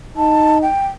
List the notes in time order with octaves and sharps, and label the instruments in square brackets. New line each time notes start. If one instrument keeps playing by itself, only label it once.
[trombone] D#4 [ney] A5
[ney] G5